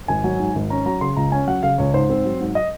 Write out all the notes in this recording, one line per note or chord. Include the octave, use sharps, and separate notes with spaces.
G#1 G#5
F#3
G#2
G#1
C#4 A#5
F#3 A#5
C#3 C6
C#2 A#5
C#4 G#5
F#3 F#5
C#3 F5
C#2 C#5
G#2 C5
C4
F#3
G#2
D#5